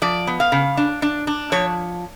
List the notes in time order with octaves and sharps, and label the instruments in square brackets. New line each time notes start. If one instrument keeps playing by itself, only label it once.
[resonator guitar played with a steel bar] F3 D5
B3
F5
C#3
D4
D4
D4
F3 C#5